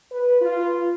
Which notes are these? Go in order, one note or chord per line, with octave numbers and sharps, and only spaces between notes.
B4
F4